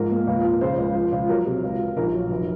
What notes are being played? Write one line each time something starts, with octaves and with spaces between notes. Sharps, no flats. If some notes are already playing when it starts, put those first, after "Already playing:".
Already playing: G#2 F3 A#4
A#3
C#2
F3
C#3 C5
C#2
F3
C#2
F#3 A#4
C3
C#2
F3
A#1 A#4
F#3
F1